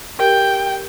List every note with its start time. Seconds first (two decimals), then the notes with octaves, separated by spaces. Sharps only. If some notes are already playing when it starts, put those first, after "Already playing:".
0.19 G4 A#4 G5